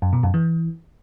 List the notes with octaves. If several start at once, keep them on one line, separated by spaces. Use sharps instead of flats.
F#2
B2
F#2
E3